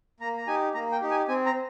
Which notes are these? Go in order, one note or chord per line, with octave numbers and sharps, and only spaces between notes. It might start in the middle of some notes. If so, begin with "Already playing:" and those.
A#3 A#5
A#5
D#4 G4 G#5
A#3 A#5
G5
D#4 G4
G#5
C4 G#5
A#5